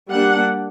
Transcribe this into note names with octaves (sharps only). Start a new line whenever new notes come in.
G3 A#3 D4 F#5